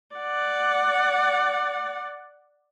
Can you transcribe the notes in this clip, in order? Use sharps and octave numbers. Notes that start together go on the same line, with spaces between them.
D5 F#5